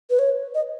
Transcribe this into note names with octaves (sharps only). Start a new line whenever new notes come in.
B4
C#5
D#5